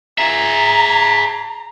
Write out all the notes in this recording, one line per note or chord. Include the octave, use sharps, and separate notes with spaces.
G#4 E5 A#5